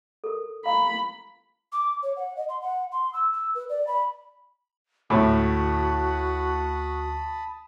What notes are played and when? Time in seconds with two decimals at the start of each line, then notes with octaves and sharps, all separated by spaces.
0.24 A4 A#4
0.66 F5 A#5 B5
1.72 D6
2.03 C#5
2.16 F#5
2.37 D#5
2.49 C6
2.62 F#5
2.92 C6
3.13 E6
3.33 E6
3.55 B4
3.69 D5
3.87 B5
5.10 D2 A2 F#4 A5 B5 D#6